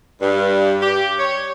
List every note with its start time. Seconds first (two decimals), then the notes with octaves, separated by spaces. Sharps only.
0.21 G2
0.82 G4
1.19 C#5